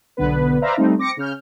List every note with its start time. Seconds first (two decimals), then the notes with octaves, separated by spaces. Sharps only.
0.17 B1 D3 B3 B4
0.61 B4 C5 D5 E5 F5 A#5
0.77 G3 A3 C4 D#4
0.98 C4 D6 A#6 C#7
1.17 C#3 C#4 F6 G6